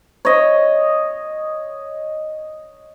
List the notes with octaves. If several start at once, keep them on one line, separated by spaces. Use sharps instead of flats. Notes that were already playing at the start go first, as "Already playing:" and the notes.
C#5 D#5